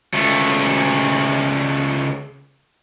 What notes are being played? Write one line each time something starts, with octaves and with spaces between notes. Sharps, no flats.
C#2 A3